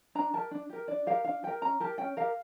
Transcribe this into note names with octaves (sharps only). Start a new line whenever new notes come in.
D4 A#5
G4 A#4 A5
D4
G4 A#4
D4 D5
G4 A#4 F5
D4 F5
G4 A#4 G5
C#4 A#5
G4 A#4 A5
C#4 G5
G4 A#4 F5